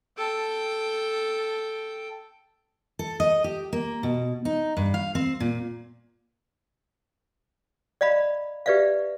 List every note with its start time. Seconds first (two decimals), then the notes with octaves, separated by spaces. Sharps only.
0.18 A4 G5
2.99 A4
3.20 D#5
3.44 G4
3.73 A#3
4.03 B2
4.45 D#4
4.77 G2
4.94 F5
5.15 C4
5.40 A#2
8.01 D5 D#5 F5 A#5 B5
8.66 G4 B4 D5 E5 F5